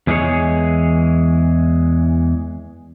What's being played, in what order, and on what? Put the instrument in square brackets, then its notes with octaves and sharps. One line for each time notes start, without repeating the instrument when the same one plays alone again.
[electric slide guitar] E2 E3 G#3 A#3 G#4 C#5